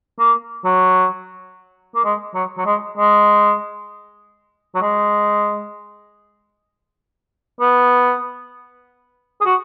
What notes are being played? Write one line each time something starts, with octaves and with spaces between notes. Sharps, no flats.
A#3
F#3
A#3
G#3
F#3
F#3
G#3
G#3
F#3
G#3
B3
G#4
F#4